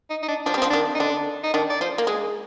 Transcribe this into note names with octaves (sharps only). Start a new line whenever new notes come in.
D#4
D#4
D4
F3 D4
G3
F3 C4
D#3 D4
D#4
D3 D4
D#4
D#3 D4
D5
F3 C5
A#3
A#4
G#3 G#4